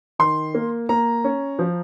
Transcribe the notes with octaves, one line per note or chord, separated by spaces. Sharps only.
D#3 C6
A#3
A#3 A#5
C#4
F3